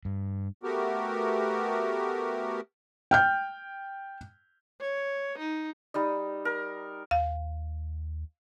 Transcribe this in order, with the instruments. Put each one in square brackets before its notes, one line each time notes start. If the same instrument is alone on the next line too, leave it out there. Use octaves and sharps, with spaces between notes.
[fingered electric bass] G2
[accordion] A3 B3 F#4 G4 A#4
[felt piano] G5 F6 G6
[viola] C#5
D#4
[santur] G3 D#4 D#5
A#4
[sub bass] D#2 [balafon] F5